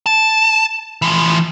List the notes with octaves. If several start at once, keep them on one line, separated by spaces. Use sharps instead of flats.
A5
E3 F3